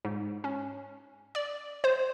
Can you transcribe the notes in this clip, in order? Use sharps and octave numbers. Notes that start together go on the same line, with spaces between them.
G#2
C#4
D5
C5